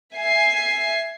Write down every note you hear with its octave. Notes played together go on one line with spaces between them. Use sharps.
E5 G#5 C7